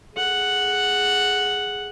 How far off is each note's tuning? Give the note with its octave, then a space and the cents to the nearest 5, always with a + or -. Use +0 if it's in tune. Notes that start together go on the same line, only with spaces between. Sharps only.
G#4 +0 F#5 +0